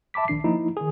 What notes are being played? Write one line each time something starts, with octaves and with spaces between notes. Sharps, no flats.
E5 A5 B5 D6 B6
A#1 D#3 D4 C7
F3 A#3 D#4 E4
D#3 G#4